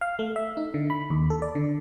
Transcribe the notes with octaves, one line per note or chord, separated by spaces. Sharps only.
F5
A3
E5
D#4
D3
B5
D#2
A4
D5
D3